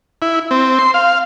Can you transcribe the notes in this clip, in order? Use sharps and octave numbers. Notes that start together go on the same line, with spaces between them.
E4
C4
C6
F5